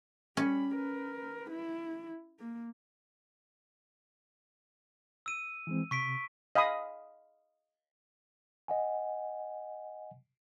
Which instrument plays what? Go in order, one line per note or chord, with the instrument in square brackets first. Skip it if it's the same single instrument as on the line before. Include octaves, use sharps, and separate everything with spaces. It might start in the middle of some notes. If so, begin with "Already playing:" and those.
[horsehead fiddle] G3 B5 [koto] C#4
[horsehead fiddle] A#4 B4
E4
A#3
[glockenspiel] E6 D#7
[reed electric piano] E3 G#3 C4
[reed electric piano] C3 [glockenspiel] C#6 B6 D7
[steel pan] D#5 F5 G#5 B5 D#6
[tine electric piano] D#5 F#5 G#5